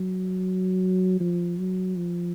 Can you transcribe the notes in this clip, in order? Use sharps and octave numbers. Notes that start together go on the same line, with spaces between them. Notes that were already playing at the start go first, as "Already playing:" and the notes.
Already playing: F#3
F3
F#3
F3